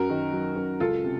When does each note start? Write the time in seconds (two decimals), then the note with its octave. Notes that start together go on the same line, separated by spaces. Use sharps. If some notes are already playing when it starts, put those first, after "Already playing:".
Already playing: F#2 F#4 A#4
0.10 D#3
0.33 F#3
0.56 F#2
0.80 C#2 F4 A4
1.04 C3